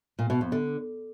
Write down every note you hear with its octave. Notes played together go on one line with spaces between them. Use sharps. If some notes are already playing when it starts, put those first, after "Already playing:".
A#2
B2
F2
D3